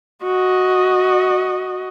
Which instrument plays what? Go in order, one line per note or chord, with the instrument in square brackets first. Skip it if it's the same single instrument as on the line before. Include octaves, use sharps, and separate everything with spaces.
[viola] F#4 D#5